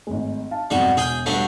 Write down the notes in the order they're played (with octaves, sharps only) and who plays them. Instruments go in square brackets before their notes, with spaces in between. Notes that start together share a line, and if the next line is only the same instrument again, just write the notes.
[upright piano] G#1 A2 G#3
F5 A5
[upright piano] F2 G#2 B2 [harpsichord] G3 F#4
[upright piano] E1 G6 [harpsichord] G#4 G5 G#5
[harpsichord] G2 F#3 A3